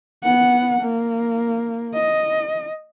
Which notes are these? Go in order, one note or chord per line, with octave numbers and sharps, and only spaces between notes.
B3 F#5
A#3
D#5